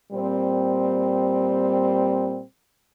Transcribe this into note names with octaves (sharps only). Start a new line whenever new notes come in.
A#2 G3 C4